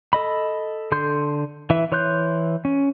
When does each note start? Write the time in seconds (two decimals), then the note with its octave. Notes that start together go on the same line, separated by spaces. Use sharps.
0.13 A4 D#5 B5
0.92 D3 A4 C6 G6
1.70 E3 E5
1.92 E3 C#5 C6 F#6 G6
2.65 C#4